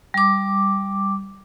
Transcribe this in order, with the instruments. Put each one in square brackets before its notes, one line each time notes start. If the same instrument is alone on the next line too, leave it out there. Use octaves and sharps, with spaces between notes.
[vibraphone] G3 D6